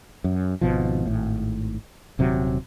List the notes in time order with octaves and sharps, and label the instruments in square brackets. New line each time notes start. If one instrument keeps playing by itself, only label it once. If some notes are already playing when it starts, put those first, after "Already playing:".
[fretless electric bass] F#2
G#1 B2 F3
G#1 A2
D#1 C3 F#3